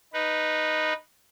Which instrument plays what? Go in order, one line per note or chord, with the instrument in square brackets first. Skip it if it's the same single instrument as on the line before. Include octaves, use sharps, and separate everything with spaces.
[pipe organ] D#4 B4